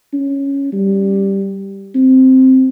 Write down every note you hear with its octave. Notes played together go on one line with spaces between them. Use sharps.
C#4
G3
C4